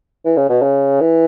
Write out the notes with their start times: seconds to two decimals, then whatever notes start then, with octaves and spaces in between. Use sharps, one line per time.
0.25 E3
0.37 C#3
0.49 B2
0.62 C#3
1.01 E3